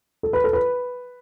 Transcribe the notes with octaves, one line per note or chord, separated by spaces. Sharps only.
A4
B4
A4
B4